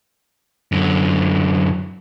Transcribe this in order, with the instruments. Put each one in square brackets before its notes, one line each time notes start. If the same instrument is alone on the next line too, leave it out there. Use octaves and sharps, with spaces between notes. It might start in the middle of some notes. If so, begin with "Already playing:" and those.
[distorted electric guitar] F#2 D3